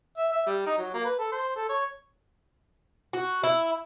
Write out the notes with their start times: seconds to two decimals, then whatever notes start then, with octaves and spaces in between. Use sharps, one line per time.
0.18 E5
0.32 E5
0.47 G3
0.66 D#4
0.78 F#3
0.94 A#3
1.05 B4
1.19 A4
1.32 C5
1.56 A4
1.69 C#5
3.13 F#4
3.44 E4